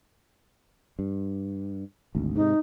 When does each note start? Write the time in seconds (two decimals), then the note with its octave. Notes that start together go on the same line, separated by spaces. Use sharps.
0.99 G2
2.15 G#1 D2
2.36 G#2 C3 D#4